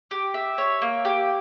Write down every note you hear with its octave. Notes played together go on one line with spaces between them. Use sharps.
G4
E5
C#5
A#3
G4